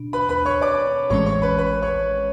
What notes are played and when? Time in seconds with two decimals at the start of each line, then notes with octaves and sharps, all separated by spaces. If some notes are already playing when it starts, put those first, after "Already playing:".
Already playing: B2 D4
0.13 B4 B5
0.29 B4 B5
0.45 C#5 C#6
0.61 D5 D6
1.10 A1 A2 E3 G#3 C#4 C#5 C#6
1.26 C#5 C#6
1.42 B4 B5
1.58 B4 B5
1.82 C#5 C#6